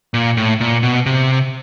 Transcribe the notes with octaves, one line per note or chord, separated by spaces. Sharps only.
A#2
A2
A#2
B2
C3